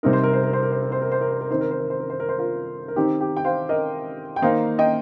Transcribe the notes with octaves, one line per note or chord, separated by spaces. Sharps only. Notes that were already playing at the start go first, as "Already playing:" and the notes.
C3 G3 C4 D#4 A#4
C5
A#4
C5
A#4
C5
A#4
C5
A#4
C5
A#4
C5
A#4
C5
A#4
D#3 C4 D#4 C5
A#4
C5
A#4
C5
A#4
C5
A#4
C5
F4 A#4
A#4
D#3 C4 D#4 G4
G4
G5
C5 F5
A#4 D#5
G5
D#3 A#3 D#4 C5 F5
D#5 G5